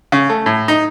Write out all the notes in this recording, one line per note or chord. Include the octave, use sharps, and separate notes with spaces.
C#3
A3
A2
D#4